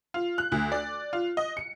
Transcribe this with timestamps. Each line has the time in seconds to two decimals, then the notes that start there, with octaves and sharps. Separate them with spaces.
0.14 F4
0.38 F#6
0.52 D2
0.72 D5
1.13 F4
1.37 D#5
1.57 C#7